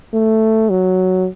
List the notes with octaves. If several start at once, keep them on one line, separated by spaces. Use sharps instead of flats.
A3
F#3